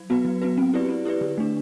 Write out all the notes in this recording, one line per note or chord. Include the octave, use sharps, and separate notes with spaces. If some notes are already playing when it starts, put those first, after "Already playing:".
Already playing: F#3
B3 F#4 B4
F#3
B3 F#4 B4
C4
E4 G4 B4 D5
C4
E4 G4 B4 D5
D3
A3 D4